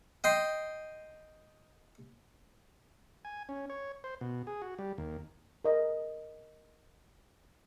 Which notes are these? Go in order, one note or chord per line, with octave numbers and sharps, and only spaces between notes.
D#5 G5 C6
G#5
C#4
C#5
C5
B2
G#4
F#4
G3
D#2
A#4 D#5